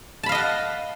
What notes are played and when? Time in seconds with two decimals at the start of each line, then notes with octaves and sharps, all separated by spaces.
0.23 A5
0.26 B5
0.29 F5
0.32 D#5
0.35 F#5